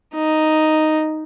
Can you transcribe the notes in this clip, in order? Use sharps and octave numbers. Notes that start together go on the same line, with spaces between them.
D#4